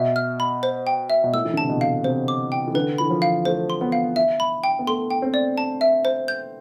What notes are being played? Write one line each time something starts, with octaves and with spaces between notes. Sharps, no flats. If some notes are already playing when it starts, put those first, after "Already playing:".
Already playing: B2 E5
F6
B5
C5
G5
E5
B2
A2 E6
E3
D3
C3 A5
B2
F5
C3 C5
D6
G5
E3
D3 B4
E3 B5
F3
F5
A3 C5
C6
B3
F5
E5
B5
G5
B3
A3 C6
G5
C4
D5
A5
E5
C5
G6